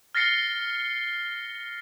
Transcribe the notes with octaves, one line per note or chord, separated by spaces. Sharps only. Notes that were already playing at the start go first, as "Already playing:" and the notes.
F6 A6 A#6 C7 C#7 G7